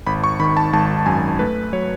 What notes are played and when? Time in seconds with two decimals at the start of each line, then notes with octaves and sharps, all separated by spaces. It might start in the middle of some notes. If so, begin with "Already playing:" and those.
0.06 G#1 B5
0.24 C#6
0.39 D#3 B5
0.57 A5
0.73 G#1 A5
1.06 F#2 G#5
1.39 A3 B4
1.73 F#3 C#5